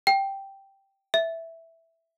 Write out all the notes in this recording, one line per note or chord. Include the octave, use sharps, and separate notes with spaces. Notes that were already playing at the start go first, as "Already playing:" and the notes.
G5
E5